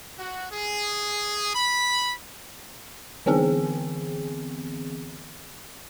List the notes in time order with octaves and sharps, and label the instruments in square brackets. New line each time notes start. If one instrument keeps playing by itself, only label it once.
[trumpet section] F#4
G#4
B5
[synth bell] D3 E3 B3 C4 G#4